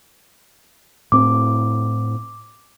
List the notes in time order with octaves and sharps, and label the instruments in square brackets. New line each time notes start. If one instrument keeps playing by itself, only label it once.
[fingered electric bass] A2 C4 [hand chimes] D6